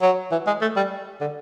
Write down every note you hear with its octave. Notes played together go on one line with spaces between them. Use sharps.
F#3
E3
G#3
A3
G3
D3